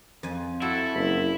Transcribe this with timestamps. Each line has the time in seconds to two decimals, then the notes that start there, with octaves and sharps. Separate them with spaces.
0.23 F2 G#5
0.62 E4 F#4 A4
0.95 F#1 B5